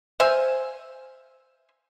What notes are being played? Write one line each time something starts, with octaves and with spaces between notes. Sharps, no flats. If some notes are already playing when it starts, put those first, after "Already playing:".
C5 E5 F5 G#5